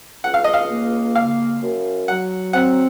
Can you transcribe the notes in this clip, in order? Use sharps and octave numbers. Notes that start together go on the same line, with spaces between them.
C#2 F#5
F5
D#5
F5
A#3
C#3 F5
F#2
F#3 F#5
C4 F#5